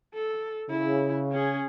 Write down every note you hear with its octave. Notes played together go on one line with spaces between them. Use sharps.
A4
C#3 E4
C#4 G#4